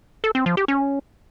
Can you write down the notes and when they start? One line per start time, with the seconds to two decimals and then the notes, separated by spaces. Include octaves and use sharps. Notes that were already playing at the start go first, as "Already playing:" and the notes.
0.24 A4
0.35 C4
0.46 F3
0.57 G4
0.68 C#4